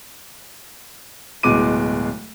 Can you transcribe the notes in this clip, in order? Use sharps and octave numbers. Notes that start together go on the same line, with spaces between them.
D1 B2 G#3 D6 D#7